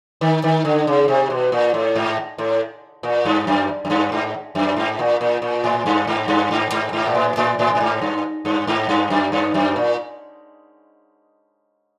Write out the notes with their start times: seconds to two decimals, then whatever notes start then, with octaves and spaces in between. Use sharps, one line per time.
0.21 D#3
0.44 D#3
0.65 D3
0.87 C#3
1.08 C3
1.30 B2
1.52 A#2
1.74 A2
1.95 G#2
2.38 A2
3.03 A#2
3.25 G2
3.47 F#2
3.85 F#2
3.90 G2
4.12 G#2
4.55 F#2
4.76 G#2
4.99 A#2
5.21 A#2
5.42 A#2
5.64 A2
5.86 G2
6.07 G#2
6.28 G2
6.51 G#2
6.72 G#2
6.93 G#2
7.06 A#2
7.15 A2
7.37 A2
7.59 A2
7.75 A2
7.80 G#2
8.01 G2
8.45 G2
8.67 G#2
8.89 G2
9.10 F#2
9.32 G2
9.54 F#2
9.76 A#2